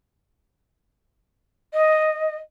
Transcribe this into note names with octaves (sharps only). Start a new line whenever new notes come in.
D#5